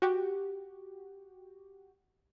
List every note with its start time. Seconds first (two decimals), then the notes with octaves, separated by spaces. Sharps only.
0.02 F#4 G4